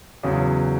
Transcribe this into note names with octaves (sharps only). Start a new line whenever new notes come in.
E2 C#3 F#3